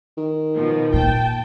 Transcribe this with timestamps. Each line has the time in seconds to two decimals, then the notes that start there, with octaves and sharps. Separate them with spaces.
0.18 D#3
0.55 B2 F3
0.94 A#2 G5 A5